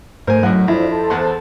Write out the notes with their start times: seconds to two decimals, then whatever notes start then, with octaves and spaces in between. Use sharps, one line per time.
0.27 G#2 A3 A#4 C5 G#5
0.43 F#2 A2 F#3 D#5 F#5
0.68 F2 D4 E4 F4 C5
0.88 A4 C5 A5
1.10 E2 F#5 C6